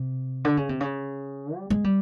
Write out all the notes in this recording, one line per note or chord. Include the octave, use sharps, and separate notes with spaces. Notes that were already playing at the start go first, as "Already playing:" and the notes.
Already playing: C3
D3
C#3
C3
C#3
G3
G#3
G3